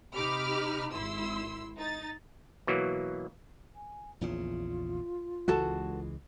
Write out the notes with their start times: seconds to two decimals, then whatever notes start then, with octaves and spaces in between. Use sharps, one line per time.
0.15 C3 D#4 G4 B5 D6 F6
0.93 G#1 E4 C6 E6
1.77 D#4 A6
2.67 B2 E3 F#3 A#3
3.76 G#5
4.21 A#1 E2 C#3 F4
5.48 C#2 E3 G#3 F#4 A4 A5